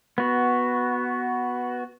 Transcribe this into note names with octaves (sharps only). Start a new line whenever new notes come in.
B3 F#4